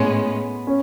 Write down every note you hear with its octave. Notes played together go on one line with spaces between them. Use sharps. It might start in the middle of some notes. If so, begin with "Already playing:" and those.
Already playing: A2 G#3 B3 C#4
C#4